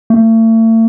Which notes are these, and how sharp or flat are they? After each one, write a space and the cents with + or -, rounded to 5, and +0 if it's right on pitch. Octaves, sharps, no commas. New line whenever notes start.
A3 +40